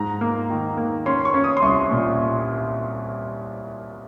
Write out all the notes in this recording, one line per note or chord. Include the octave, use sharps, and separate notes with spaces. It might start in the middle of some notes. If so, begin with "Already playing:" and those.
Already playing: G#2 A#5
A#3
D#3
A#3
C#4 C6
C#6
C#4
D#6
C6
C2 C#6
A#2